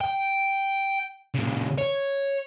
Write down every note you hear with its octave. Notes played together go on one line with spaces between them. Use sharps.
G5
A#2 C#3
C#5